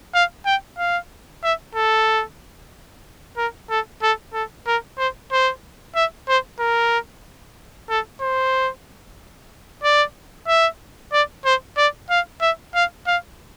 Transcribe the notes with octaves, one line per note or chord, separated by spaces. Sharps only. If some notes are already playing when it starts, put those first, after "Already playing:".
F5
G5
F5
E5
A4
A#4
A4
A4
A4
A#4
C5
C5
E5
C5
A#4
A4
C5
D5
E5
D5
C5
D5
F5
E5
F5
F5